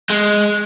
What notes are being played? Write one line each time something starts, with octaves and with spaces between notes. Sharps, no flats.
G#3